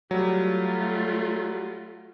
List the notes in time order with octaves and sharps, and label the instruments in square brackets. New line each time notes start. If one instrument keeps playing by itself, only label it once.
[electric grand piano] F#3 G3 [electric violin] A3 F4